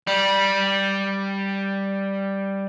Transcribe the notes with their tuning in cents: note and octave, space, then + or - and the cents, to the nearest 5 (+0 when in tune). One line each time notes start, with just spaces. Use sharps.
G3 +0 B5 -25